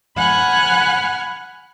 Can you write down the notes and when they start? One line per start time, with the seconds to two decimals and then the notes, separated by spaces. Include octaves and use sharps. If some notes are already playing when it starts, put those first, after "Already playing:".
0.16 F#5 G#5 B5 F6 F#6